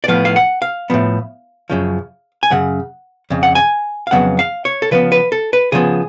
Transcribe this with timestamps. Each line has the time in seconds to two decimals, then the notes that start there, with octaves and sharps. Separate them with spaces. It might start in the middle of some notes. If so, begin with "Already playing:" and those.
0.04 D5
0.08 A2 F3 B3 F5
0.25 F5
0.36 F#5
0.62 F5
0.90 A2 F3 B3
1.70 F#2 C#3 F3
2.43 G#5
2.51 F#2 C#3 F#5
3.30 F2 C#3
3.43 F#5
3.55 G#5
4.07 F5
4.11 F2 C#3 F#3 B3 F#5
4.39 F5
4.65 C#5
4.82 A4
4.91 C#3 F3 B3 B4
5.12 B4
5.32 A4
5.53 B4
5.72 C#3 F3 B3 G#4